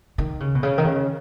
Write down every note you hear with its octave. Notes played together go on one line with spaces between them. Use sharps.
D#3
C#3
B2
C#3
D#3
C#3